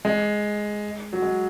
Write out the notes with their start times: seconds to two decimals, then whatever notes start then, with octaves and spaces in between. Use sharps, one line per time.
0.05 G#3
1.13 F#3
1.22 G#3